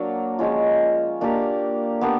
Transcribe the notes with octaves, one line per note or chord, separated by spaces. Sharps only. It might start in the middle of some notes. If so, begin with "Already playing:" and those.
Already playing: F#3 A#3 D4
F3 G#3 C#4 F4
A#3 D4 G4 A#4
B3 D4 G4 A#4